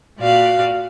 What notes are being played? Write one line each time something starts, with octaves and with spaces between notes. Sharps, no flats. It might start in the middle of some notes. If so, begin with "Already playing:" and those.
A#2 F#4 D5 F5